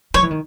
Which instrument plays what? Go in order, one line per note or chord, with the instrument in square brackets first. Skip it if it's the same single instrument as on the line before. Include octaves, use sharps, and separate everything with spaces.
[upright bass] F#3 [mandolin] C#5
[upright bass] E3
D#3